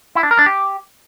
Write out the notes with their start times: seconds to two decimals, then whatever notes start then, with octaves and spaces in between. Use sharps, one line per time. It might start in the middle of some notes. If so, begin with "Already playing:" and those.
0.15 E4
0.23 D4
0.31 A#4
0.39 D4
0.46 G4